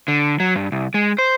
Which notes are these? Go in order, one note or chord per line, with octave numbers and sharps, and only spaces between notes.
D3
F#3
G2
C2
G#3
C5